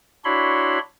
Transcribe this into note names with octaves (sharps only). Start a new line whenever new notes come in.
D4 E4 F#4 C#5 B5 C6